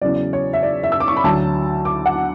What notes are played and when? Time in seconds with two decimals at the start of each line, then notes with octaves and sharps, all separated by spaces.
0.02 E2 C#3 F#3 D5
0.33 C#5
0.53 E5
0.63 D5
0.83 E5
0.92 E6
1.00 D6
1.08 C#6
1.17 B5
1.24 D2 D3 F#3 A5
1.85 D6
2.06 F#5